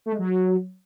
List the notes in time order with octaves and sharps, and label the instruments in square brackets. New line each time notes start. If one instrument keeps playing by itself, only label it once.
[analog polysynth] A3
G#3
F#3